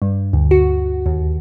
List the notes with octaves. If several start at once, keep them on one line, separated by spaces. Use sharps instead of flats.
G2
D2
F#4
D#2